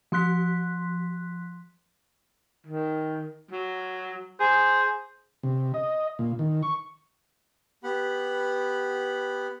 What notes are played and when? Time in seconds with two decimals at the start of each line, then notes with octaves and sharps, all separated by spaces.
0.12 F3 C6 F#6 B6
2.67 D#3
3.52 F#3
4.40 G#4 C5
5.43 C3
5.74 D#5
6.19 A#2
6.39 D#3
6.63 C#6
7.84 B3 G4 F#5 B5